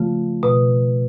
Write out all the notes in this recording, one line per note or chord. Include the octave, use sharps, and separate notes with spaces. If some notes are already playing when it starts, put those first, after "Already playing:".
Already playing: C#3 F3 A3 F4
B2